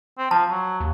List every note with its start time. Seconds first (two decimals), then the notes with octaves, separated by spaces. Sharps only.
0.18 C4
0.31 F3 A5
0.50 F#3
0.80 D#2